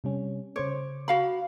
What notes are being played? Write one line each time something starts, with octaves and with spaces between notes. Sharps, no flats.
C3 G3 C#4
C#3 C5 C#5 D6
F#4 F5 B5